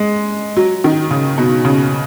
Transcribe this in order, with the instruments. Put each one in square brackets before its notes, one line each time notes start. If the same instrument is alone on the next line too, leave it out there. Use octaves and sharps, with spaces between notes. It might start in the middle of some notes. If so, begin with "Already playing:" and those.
Already playing: [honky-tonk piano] G#3
F#3
D#3
C#3
B2
C#3